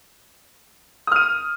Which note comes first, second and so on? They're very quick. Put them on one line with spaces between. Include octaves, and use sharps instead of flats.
D#6 F6 D#7